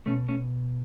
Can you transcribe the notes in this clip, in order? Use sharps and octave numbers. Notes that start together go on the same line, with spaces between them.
B2 A3 C#4
A3 C#4